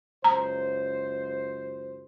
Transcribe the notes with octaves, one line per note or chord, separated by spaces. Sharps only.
C#2 F#2 C5 A#5